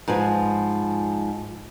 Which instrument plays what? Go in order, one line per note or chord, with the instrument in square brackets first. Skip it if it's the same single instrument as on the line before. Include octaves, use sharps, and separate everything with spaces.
[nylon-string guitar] G#2 F3 B4 G#5